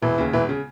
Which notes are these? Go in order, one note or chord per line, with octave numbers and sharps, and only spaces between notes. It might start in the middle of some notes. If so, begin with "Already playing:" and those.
E1 E3
D#2 C#3
E1 E3
C#3